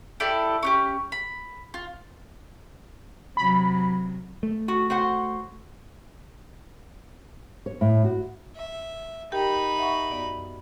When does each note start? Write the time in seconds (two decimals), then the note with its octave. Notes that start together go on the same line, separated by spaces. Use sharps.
0.20 E4 G4 A4 D5
0.63 C#4 D#4 G4
1.12 B5
1.74 F4
3.37 C3 F#3 B5
4.43 A3
4.68 F#4
4.90 F#4 C5 F#5
7.66 C#5
7.81 A2
8.04 F#4
8.55 E5
9.32 D#4 G4 A#4 G5 B5
9.78 E5 F#5 C#6
10.11 F#2 B3 D5